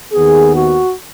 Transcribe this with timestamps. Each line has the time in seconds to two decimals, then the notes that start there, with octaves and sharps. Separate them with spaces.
0.13 D#2 D#3 B3 G#4
0.55 F#4